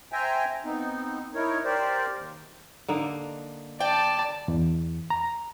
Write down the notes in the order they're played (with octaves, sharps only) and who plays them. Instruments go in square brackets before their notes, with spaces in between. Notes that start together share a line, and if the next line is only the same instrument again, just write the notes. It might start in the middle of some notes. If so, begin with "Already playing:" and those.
[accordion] C5 E5 G5 G#5 A#5
B3 C4 D#4
D#4 E4 A#4 C#5
G4 A#4 C5 D5
D#2
[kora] D3 A#3 D#4
[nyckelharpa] D5 A5 [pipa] G5
[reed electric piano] E2
A#5